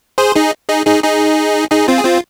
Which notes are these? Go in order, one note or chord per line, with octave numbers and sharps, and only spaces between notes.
G#4 C5
D#4 G#4
D#4 G#4
D#4 G#4
D#4 G#4
D#4 G#4
C4 F4
G#4
C4 F4